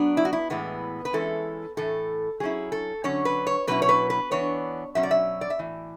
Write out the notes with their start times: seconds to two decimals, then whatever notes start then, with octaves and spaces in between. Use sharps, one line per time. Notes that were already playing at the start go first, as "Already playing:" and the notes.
Already playing: F#3 B3 D4
0.17 E4
0.25 F#4
0.33 E4
0.50 A2 E3 G#3 B3
1.05 B4
1.13 E3 G#3 C#4 E4 A4
1.77 A2 E3 A3 A4
2.40 F#3 C#4 E4 G#4
2.72 A4
3.04 D3 F#3 C#4 C#5
3.25 B4
3.47 C#5
3.67 B2 F#3 C#4 E4 B4
3.82 C#5
3.89 B4
4.10 B4
4.31 E3 B3 D4 C#5
4.95 B2 F#3 C#4 E5
5.03 D5
5.11 E5
5.41 D5
5.50 E5
5.59 A2 E3